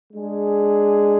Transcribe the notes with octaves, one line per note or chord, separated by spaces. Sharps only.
G#3 D4 G#4